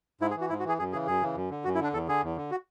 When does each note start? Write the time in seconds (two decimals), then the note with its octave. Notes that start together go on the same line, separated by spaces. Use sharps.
0.21 G#2 E4
0.31 G#4
0.36 E3
0.41 F#4
0.49 G#2 E4
0.59 F#4
0.64 E3 G#4
0.79 F#2 G#4
0.92 C#3 E3 G#4
1.07 F#2 G#4
1.21 C#3 E3
1.35 F#2
1.51 D3
1.64 F#2 F#4
1.75 E4
1.80 D3 D4
1.93 E2 A4
2.08 D3 G#4
2.23 E2
2.37 D3
2.51 F#4